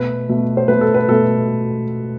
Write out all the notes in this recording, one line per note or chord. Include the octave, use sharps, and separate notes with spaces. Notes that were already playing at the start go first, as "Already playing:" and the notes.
Already playing: B2 A3 B4
B2 A3
C5
B2 A3 B4
A4
B4
B2 A3 A4